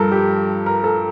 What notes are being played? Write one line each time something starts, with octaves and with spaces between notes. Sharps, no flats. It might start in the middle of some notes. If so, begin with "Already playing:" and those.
Already playing: G2 F3 A4 A#4
G4
A#4
A4